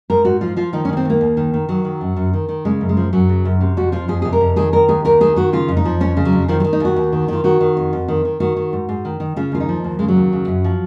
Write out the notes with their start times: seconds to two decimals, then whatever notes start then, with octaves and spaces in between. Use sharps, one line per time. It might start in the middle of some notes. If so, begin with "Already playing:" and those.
0.10 G#2 A#4
0.25 G#2 F#4
0.41 F3 F4
0.57 F3 F4
0.73 D#3 D#4
0.85 C#4
0.89 D#3 A#3
0.97 C4
1.05 D#2 A#3
1.21 D#2
1.37 D#3
1.54 D#3
1.69 D#3 F#3
1.85 D#3
2.01 F#2
2.16 F#2
2.33 D#3
2.49 D#3
2.65 C#3 G#3
2.81 F#2
2.89 G#3
2.97 F3
3.13 F#2 F#3
3.29 C#3
3.45 F#2
3.61 C3
3.77 F2 F#4
3.92 F3 F4
4.08 F2 G#4
4.22 C3 G#4
4.33 A#4
4.41 F2
4.56 D#3 G#4
4.72 D#3 A#4
4.88 D#2 G#4
5.05 D#2 A#4
5.21 D#3 G#4
5.36 D#3 F#4
5.53 C#3 F4
5.68 F2
5.77 D#4
5.85 F3
6.00 F2 C#4
6.17 C#3
6.25 F#3
6.33 F2
6.48 D#3 F3
6.60 F#3
6.64 D#3
6.73 D#4
6.80 D#2 F#4
6.96 D#2
7.12 D#3
7.28 D#3 F4
7.44 D#3 F#4
7.61 D#3
7.77 F2
7.93 F2
8.08 D#3
8.25 D#3
8.40 D#3 F#4
8.56 D#3
8.73 G#2
8.89 G#2
9.05 D#3
9.20 D#3
9.37 C#3 F4
9.52 D#2 F4
9.60 D#4
9.69 F3
9.84 D#2
9.99 C#3 G#3
10.08 F#3
10.16 D#2
10.33 C#3
10.48 F#2
10.64 F3